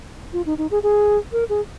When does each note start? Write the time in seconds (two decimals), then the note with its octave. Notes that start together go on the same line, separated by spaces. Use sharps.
0.33 F4
0.46 D#4
0.58 D#4
0.71 G#4
0.83 G#4
1.32 A#4
1.49 G#4